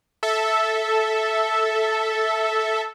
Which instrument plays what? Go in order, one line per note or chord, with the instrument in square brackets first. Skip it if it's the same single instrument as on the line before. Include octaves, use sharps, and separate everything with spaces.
[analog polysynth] A4 E5